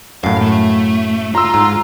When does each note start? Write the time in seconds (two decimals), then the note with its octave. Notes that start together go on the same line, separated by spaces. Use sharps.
0.24 F#2 A2 F5
0.41 A3
1.35 F4 A#5 C6 E6
1.54 G#2